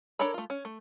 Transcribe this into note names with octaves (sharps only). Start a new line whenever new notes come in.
D4 A4 A#4 C#5 B5
A3 F4
C#4
A3